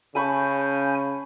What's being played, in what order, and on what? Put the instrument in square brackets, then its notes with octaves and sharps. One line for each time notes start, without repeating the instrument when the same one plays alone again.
[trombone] C#3 [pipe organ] G#5 G6 [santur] A5 B5 C#6